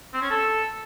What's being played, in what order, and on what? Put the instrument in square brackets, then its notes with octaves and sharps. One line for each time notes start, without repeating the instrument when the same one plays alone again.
[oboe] C4
C#4
A4